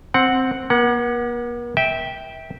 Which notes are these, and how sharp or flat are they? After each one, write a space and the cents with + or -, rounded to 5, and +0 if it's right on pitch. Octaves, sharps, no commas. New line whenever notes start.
C4 +0 F#5 +0
A#3 +45 F#5 +0
E5 -20 G5 +0